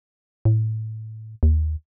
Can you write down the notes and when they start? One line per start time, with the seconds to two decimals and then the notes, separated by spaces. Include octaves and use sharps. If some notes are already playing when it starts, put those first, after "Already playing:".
0.45 A2
1.43 D#2